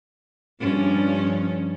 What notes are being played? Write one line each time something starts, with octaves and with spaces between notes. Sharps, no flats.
G2 F3 C#4